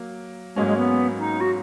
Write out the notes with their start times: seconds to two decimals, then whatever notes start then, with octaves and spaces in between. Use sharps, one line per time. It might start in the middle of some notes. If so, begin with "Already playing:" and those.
Already playing: F#3 A#3
0.55 G#2 F#3 G#3 A#3 C#4
0.66 G#3
0.77 B3
1.19 D#4
1.40 F#4